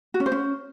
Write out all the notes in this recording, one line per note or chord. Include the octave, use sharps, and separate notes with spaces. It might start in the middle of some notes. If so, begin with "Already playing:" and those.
F#4
C#4
C5
C#4